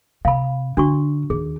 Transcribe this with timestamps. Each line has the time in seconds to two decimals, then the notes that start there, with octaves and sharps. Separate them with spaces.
0.25 C3 F5 B5
0.77 D3 D4 F#4 C#6
1.30 D#2 D#3 G#4